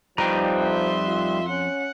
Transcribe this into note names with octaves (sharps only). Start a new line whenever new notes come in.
F2 F3 G3 D#4 B4 G5 A#5
E5 C6
F4
C#4 F#5